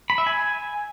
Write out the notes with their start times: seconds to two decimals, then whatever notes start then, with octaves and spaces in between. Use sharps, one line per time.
0.10 B5
0.18 E5
0.26 G#5